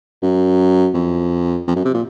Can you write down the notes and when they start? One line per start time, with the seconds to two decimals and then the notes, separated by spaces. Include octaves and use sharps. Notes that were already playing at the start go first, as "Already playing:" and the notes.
0.22 F#2
0.94 F2
1.68 F2
1.76 F#2
1.85 C3
1.94 A#2